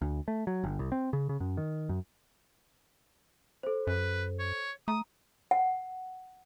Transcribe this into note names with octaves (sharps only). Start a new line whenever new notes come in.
D2
A3
F#3
G1
C2
C4
C#3
C#3
F#2
D#3
F#2
A4 C5
F#2 B4
C#5
A3 A#5 D#6
F#5